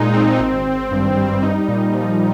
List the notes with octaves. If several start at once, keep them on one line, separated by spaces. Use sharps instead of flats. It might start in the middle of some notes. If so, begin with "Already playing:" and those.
Already playing: A#2 G#3 D#4
C4
G#1
G#1
G2
G3
D#4
A#2
F3